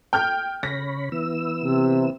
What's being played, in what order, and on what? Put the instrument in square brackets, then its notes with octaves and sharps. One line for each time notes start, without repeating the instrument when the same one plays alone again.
[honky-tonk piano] G5 F6 G6
[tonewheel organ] C#3 C#5 B5 [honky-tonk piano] A#6
[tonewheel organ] E3 B3 E6
[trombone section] C3